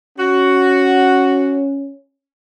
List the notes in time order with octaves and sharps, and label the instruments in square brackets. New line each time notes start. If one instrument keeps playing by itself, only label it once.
[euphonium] C#4 [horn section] F#4